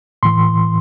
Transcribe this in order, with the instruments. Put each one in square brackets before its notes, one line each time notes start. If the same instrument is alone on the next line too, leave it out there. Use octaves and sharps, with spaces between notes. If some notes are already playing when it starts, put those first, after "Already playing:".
[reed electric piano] A2 E3 C6